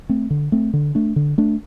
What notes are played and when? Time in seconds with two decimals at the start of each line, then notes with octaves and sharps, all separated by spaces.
0.09 A3 C4
0.30 D3
0.52 A3 C4
0.73 D3
0.95 A3 D4
1.16 D3
1.38 A3 D4